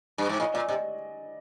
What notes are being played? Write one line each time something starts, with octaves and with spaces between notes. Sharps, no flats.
G2
G#2
A2 D#5
A#2 D5
C3 D#5